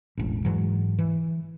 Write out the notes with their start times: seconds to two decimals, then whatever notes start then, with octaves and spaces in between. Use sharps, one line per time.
0.17 E1 A1
0.45 G#2 E3 F#3
0.99 E3